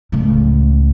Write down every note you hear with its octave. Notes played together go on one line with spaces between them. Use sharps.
C#2 A2